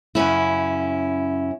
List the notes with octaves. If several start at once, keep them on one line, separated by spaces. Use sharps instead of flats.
F#2 C#3 C#4 E4